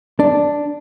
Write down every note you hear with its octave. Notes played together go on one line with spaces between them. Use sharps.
D4